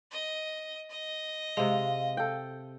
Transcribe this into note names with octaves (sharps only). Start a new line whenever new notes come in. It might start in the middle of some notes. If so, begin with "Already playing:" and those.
D#5
D#5
C3 G#3 F5
A4 G5